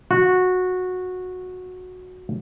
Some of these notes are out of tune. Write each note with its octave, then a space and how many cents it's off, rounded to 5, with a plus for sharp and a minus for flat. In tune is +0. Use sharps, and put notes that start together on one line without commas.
F#4 -15